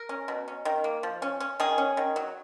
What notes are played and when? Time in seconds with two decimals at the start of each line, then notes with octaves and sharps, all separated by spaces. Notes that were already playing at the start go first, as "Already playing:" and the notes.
Already playing: A#4
0.09 C#4
0.28 B2
0.48 C#4
0.65 D#3
0.84 A#3
1.03 F3
1.22 C#4
1.40 C#4
1.60 D#3 G#4
1.78 C#4
1.97 D#3
2.16 F#3